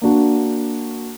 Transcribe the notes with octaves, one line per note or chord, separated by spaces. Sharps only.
A#3 D4 F#4